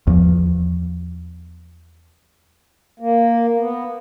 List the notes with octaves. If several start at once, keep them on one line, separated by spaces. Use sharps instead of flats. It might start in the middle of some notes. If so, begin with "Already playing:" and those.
E2 F3
A#3
B3